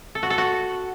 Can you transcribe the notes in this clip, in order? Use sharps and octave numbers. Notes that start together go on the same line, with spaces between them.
A4
F#4
A4
F#4